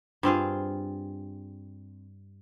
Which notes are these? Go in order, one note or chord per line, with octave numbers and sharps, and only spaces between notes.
G2 C4 F4 G#4